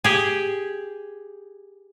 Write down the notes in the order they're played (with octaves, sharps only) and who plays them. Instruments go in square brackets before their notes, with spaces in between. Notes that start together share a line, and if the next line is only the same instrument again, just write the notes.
[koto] G4 G#4